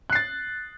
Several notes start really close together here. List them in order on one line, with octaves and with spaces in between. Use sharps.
F#6 C7 A6